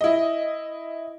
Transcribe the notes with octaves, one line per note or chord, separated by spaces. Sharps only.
E4 D#5